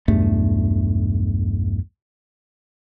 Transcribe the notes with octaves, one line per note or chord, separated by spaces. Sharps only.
B1 E2 G2 A3